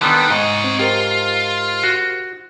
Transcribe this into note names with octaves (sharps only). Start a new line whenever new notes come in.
D3 D#3 G3 B3
G#2 C#5 D#5
C4
F4 G4 A#4 C5
F#4